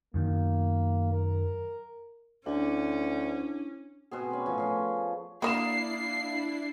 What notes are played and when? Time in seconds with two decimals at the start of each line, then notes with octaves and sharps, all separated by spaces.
0.14 F#2 D#3 A#3
1.12 A#4
2.46 D2 C#4 D4 E4
4.11 B2 C4 G#4
4.30 C#4 B4
4.46 A2 F3 G#5
4.58 C#4 G#4
5.42 A#3 D4 E4 F#4 A#4 D#6 C7 E7